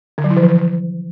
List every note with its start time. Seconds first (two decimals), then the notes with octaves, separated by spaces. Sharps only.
0.18 D3
0.24 F#3
0.30 E4
0.37 F3
0.43 E3